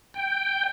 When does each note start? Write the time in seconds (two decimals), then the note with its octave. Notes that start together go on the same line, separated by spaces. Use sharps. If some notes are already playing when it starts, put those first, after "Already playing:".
0.14 G5